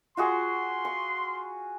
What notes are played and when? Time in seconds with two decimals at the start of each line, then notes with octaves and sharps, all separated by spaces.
0.17 F4 F#4 G#4 C6
0.85 C#6